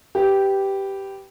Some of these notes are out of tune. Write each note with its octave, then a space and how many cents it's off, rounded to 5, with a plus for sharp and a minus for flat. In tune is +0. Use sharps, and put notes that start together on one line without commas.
G4 -5 B4 +5